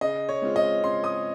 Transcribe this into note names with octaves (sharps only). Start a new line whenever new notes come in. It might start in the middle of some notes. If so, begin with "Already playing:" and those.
C#3 D#5
C#5
G#3 C4 F4
D#5
C#3 C6
D#6